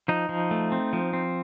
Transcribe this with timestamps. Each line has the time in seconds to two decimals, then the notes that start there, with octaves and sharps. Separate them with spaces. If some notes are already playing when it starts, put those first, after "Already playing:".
0.08 F3 D#4
0.29 F3
0.51 A3
0.72 C4
0.93 F3
1.13 C4